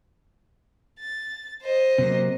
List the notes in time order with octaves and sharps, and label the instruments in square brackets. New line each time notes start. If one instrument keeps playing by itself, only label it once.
[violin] A6
C5 D#5
[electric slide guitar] C3 F#3 A#3